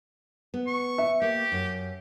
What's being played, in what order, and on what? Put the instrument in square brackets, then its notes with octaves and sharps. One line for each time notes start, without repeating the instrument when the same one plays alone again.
[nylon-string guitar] B3
[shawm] C#6
[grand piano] E5
[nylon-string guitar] A#3 [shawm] G4
[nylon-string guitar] F#2